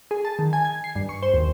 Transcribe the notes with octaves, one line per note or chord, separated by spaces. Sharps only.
G#4
A5
D#3
G#5
G#6
C7
G2
C#6
C5
D#2